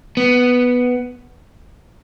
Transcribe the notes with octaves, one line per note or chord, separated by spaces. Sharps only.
B3